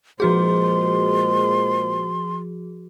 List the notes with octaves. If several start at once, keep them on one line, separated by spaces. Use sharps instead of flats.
A#2 F3 G#3 F#4 G#4 C5 C6